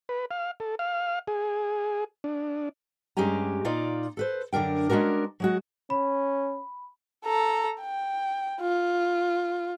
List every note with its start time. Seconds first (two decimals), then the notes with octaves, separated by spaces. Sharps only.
0.09 B4
0.31 F5
0.60 A4
0.79 F5
1.28 G#4
2.24 D4
3.17 G2 G#3 C#4 G4 G#5 A#5
3.65 A#2 D#4 F4 D5 A#5
4.17 A4 B4 C5
4.53 F#2 D3 D4 A#4 G5
4.89 G#3 C#4 D4 F#4 A#4
5.40 F#3 G#3 F#4
5.90 C#4 B5
7.26 A4 A#5
7.81 G5
8.61 F4